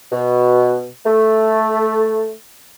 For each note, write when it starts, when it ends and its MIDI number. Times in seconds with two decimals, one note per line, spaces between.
0.11 0.85 47
1.05 2.29 57